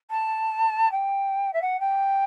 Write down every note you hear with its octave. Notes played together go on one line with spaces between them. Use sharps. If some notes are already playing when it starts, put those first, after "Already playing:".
A5
G5
E5
F#5
G5